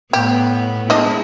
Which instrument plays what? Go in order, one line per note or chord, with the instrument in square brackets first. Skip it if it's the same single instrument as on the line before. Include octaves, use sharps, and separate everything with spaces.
[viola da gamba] A2 B3 [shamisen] G4
[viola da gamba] G#3 E4 [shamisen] D4 D#5